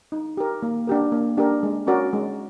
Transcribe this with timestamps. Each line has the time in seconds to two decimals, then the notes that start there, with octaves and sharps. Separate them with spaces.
0.12 D#4
0.37 G4 A#4
0.63 A#3
0.87 D4 G4 A#4
1.12 A#3
1.38 D4 G4 A#4
1.63 G#3
1.87 C#4 F#4 A#4 D5
2.13 G#3